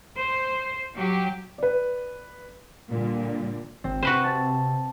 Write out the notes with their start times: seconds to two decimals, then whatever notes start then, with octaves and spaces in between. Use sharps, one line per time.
0.16 C5
0.95 F#3 G4
1.58 B4 D5
2.90 A#2 D3 G3
3.84 G#1 C4
4.03 C3 F#4 B4 C5
4.24 A5 A6